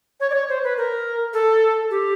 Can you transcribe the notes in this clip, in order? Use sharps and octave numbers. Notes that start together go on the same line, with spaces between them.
C#5
D5
C#5
C5
B4
A#4
A4
G4